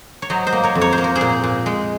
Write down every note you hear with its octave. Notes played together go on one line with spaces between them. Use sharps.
C#5
F#3 C5 D#5
C5 D#5
A#3
A#4 C#5
F2
C#5
C5
A#3
A#4
G#4 C5
A#2
A#2
G#3